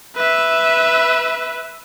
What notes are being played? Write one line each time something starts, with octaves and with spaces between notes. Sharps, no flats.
B4 E5